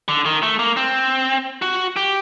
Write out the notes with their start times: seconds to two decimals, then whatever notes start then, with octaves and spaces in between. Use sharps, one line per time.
0.08 D3
0.26 D#3
0.43 A3
0.59 A#3
0.77 C4
1.62 F#4
1.96 G4